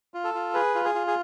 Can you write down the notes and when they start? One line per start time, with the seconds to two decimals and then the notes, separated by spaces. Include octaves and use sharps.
0.14 F4
0.24 A4
0.34 F4
0.54 G#4 B4
0.75 F4
0.85 G#4
0.95 F4
1.07 G#4